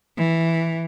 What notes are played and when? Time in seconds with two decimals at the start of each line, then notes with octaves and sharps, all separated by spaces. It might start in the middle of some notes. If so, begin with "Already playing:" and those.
0.17 E3